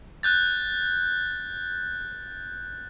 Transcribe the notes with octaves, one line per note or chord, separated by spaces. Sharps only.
F#6 G6 A6